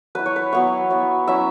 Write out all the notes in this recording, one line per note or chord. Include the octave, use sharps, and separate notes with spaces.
F#3 E4 B4
C#5
B4
F#3 B3 E4 C#5
F#3 B3 E4
F#3 C#4 E4 E5